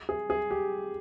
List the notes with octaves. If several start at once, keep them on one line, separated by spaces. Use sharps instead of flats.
G#4
G#4
G4